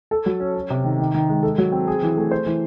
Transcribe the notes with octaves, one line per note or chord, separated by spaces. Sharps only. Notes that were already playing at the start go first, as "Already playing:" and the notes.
A4
F#3
C#4
C#4
C3
D#3
D#3
D#3
G#3
A4
F#3
C4
G#4
E3
A3
C5
E3